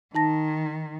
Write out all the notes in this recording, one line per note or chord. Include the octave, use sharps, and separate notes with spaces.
D#3 D#4 A5 A#6